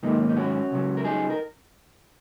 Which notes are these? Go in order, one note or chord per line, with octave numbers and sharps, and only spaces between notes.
G#2 D#3 F#3 A#3 D#4
C#4
D#4
C#4 F#4
C#2 C#3 F#3
A#4
D#4 G#4
A#4